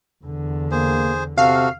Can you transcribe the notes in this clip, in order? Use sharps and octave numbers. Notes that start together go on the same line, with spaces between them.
E2 D3
A#3 G#4 C5
C3 F#4 A4 F5